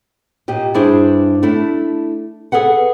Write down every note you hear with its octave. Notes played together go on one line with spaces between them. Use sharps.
A#2 G4 D#5
G2 D4 E4 G#4 C5
A3 D4 E4
G#4 A4 B4 F#5